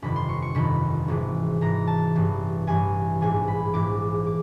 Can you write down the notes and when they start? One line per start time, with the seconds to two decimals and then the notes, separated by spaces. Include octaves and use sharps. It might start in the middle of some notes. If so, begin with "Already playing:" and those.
0.02 G1 F2 C3 D#3 B5
0.16 C6
0.29 C#6
0.42 C#6
0.55 G1 F2 C3 D#3 B5
1.08 G#1 G#2 E3
1.61 G#1 G#2 E3 A#5
1.87 A5
2.15 A1 G2 E3
2.67 A1 G2 E3 G#5
3.21 A#1 G#2 E3 G#5
3.48 B5
3.73 A#1 G#2 E3 D6
4.27 D6